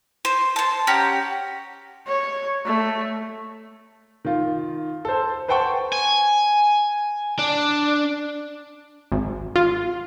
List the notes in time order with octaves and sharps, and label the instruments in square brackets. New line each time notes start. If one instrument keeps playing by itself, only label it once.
[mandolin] C5
C5 A5
C#4 G4 F#5 A#5
[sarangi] C#5
A3
[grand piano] D#3 F4
A4 C5
B4 C5 F#5 G5 A5 C#6
[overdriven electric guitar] G#5
D4
[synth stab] G#1
F4